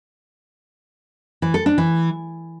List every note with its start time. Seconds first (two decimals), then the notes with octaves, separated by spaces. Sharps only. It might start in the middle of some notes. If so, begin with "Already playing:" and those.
1.42 E3
1.54 A4
1.66 D4
1.78 E3